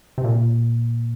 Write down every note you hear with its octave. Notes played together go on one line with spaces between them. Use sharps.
C3
A#2